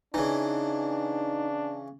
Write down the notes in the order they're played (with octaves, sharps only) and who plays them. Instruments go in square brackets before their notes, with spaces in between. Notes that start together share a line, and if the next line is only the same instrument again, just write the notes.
[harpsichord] C#3 E3 [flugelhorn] D4 [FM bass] D#4